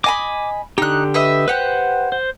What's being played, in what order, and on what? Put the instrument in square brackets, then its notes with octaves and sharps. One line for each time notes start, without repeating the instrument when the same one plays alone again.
[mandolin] D#5 G#5 B5 [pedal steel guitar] D6
[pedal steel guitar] D3 G4 [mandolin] D#4 F#6
[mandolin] B4 D#5 E5
[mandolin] G4 F#5 [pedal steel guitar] B4 C5
[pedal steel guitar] C5